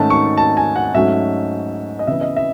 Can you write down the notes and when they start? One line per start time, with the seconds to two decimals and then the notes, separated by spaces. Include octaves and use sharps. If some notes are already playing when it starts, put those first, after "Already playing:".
Already playing: G#2 D#3 A3 C#4 A5
0.10 C#6
0.37 A5
0.57 G#5
0.76 F#5
0.94 G#2 F#3 A3 C#4 E5
1.99 D#5
2.07 C#3 E3 B3 E5
2.21 D#5
2.36 E5